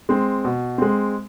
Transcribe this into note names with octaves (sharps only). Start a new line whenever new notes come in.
G#3 C4
B2
G#3 C4